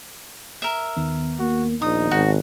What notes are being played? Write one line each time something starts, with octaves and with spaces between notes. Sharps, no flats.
A#4 E5
D#2 D#3 B3
A#3 F#4
A#1 D#4 D#6
G#1 F#4